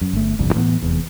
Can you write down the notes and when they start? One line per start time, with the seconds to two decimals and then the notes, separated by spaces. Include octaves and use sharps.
0.01 F#2
0.13 G1 A3
0.39 G1 C2 F2
0.53 A2 E3 A#3 B3
0.82 F1 E2